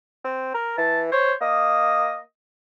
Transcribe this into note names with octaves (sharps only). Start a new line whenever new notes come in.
C4
A#4
E3 A5
C5 C#5
A#3 D#5